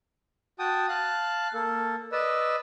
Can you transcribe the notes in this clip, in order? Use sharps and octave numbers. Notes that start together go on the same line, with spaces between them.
F#4 G5 A5 D#6
F5 A5 F#6
A#3 A4
B4 D5 D#5 E6